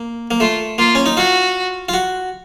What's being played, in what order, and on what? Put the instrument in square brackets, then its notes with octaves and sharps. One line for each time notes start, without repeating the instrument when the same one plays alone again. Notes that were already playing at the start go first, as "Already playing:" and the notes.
Already playing: [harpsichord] A#3
A#3
[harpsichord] A3 [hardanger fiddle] F4
[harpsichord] A#3 [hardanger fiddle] F4
[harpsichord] C#4
D#4
[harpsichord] F4 [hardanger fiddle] F#4
[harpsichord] F4
F#4